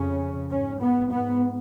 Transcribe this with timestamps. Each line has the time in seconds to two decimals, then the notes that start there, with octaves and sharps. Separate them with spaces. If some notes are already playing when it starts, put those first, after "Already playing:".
Already playing: F2 C#3 C#4
0.50 G#2 C#4
0.80 B3
1.11 G#2 B3